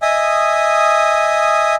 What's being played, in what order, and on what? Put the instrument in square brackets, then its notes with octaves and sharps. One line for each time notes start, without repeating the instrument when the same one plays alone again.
[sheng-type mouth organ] D#5 E5 G#5 D#6